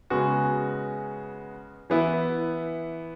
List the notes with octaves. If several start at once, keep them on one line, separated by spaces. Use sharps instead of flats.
C#3 G#3 B3 F#4
E3 B3 E4